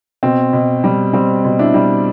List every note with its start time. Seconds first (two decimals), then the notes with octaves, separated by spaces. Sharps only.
0.23 B2 C4
0.53 B2
0.84 G3
1.13 G3 C4
1.44 B2
1.59 D4 E4
1.74 G3